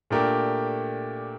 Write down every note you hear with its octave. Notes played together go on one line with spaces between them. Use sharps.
A#2 A3 D4 G4 A#4